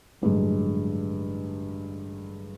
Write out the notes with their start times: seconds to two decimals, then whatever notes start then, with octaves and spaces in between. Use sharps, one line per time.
0.22 A1 G2 D3 F#3 G#3